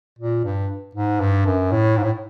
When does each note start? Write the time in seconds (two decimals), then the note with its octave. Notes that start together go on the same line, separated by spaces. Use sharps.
0.19 A#2
0.45 G2
0.95 G#2
1.20 G2
1.46 F#2
1.71 A2
1.97 G#2
2.04 A2